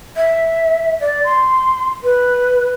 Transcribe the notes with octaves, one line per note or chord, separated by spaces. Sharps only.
E5
D5
C6
B4